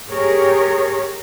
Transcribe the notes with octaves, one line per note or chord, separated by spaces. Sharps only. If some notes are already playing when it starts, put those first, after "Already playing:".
G4 G#4 A#4 C#5